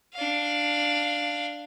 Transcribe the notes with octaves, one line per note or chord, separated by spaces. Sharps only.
D4 F5